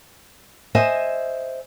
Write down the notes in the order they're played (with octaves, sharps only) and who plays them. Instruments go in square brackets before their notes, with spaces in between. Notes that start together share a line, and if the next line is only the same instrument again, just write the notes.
[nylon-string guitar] C5 D#5 E5 G#5